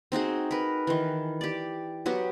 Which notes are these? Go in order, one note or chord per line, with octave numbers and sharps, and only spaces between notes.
C4 D#4 F#4 G#4
A#4 B4
D#3 E3
G4 D5
F#3 B3 F#4 G4